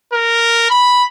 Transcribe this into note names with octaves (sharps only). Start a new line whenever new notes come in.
A#4
B5